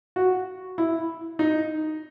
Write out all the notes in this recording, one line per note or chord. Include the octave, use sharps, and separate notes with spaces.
F#4
E4
D#4